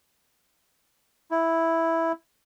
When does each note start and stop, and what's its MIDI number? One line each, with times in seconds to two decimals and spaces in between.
1.31 2.12 64